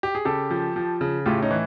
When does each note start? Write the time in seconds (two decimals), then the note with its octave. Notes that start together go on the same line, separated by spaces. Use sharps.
0.03 G4
0.15 G#4
0.25 C#3 G4 A4
0.51 F3
0.76 F3
1.01 C#3
1.26 A2 F4 G4
1.42 C#4 D#4
1.51 E3